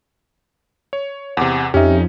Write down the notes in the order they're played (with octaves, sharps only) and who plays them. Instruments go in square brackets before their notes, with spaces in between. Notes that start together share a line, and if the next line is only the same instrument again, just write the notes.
[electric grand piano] C#5
[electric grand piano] E2 C3 [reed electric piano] F#5 D6
[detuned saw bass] F2 [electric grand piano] C#4 D#4 [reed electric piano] G4 E5